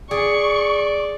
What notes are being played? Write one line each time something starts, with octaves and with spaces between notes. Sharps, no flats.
G#4 D5 C#6